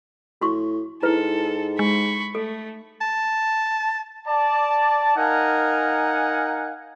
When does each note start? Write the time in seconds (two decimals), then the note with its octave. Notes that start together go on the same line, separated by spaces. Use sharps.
0.41 A2 F#4 C6 C#6
1.03 G#2 E4 A4 B4
1.79 G#3 B5 C#6
2.35 A3 A4
3.01 A5
4.28 D5 A5
5.17 D#4 A#4 F5 F#5 G#5